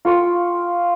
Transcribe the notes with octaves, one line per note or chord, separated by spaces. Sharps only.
F4 G5 C#6